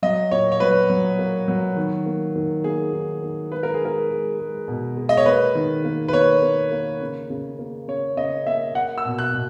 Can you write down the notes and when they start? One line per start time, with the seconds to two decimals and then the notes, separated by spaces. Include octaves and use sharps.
0.03 F#3 D#5
0.31 A#2 C#5
0.52 C#5
0.60 F#3 B4
0.90 F#3
1.19 A#3
1.48 F#3
1.76 D#3
2.06 A#3
2.36 D#3
2.64 A#3 G#4
2.93 D#3
3.22 D#3
3.52 G#3 B4
3.63 A#4
3.74 G#4
3.81 G#3 A#4
4.10 G#3
4.39 G#3
4.68 B2
4.97 G#3
5.09 D#5
5.17 C#5
5.26 A#3 B4
5.55 D#3
5.84 A#3
6.08 B4
6.13 A#3 C#5
6.43 A#3
6.72 A#3
7.01 C#3
7.30 C#3
7.59 A#3
7.88 C#3 C#5
8.17 C#3 D#5
8.46 A#3 E5
8.75 A#3 F#5
8.98 E6
9.05 B2
9.19 F#6
9.34 B2